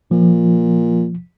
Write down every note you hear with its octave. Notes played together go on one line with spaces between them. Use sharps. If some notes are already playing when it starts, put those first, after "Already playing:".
A#2 F3